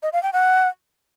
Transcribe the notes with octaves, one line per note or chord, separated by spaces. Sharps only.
D#5
F5
G5
F#5